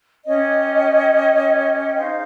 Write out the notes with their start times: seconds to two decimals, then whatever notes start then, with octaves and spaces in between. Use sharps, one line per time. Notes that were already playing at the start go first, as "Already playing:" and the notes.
0.25 C#4 G4 C#5 D#5
1.85 G5
1.95 D#4 G#4 C5 F5